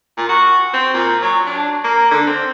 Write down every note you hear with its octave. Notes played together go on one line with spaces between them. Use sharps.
A#2
F#4
C4
A#2
F#3
D4
A#3
D3
C4